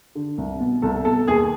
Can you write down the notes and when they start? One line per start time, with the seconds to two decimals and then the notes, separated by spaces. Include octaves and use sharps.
0.15 D3
0.38 C2
0.60 B2
0.82 C2 A4
1.05 B2 A4
1.28 D#2 G#4